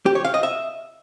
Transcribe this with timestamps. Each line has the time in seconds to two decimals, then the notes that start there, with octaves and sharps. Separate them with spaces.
0.06 G4
0.15 C#5
0.25 F5
0.34 D#5
0.43 E5